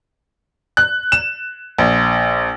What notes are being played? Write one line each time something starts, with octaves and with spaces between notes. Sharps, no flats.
F#6
E7
A#1